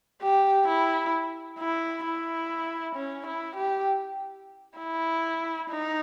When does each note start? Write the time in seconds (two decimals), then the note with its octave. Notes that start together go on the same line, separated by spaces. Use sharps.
0.22 G4
0.68 E4
1.59 E4
2.05 E4
2.95 C#4
3.27 E4
3.56 G4
4.78 E4
5.70 D#4